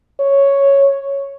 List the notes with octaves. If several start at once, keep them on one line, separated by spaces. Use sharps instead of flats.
C#5